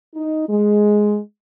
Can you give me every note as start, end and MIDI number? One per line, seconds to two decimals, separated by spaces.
0.15 0.46 63
0.48 1.18 56